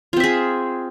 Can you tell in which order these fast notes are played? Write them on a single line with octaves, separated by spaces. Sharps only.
F4 C4 E5 G#4